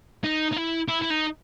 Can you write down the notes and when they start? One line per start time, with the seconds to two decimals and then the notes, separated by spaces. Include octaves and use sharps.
0.24 D#4
0.52 D#4
0.56 E4
0.88 E4
1.02 E4
1.10 D#4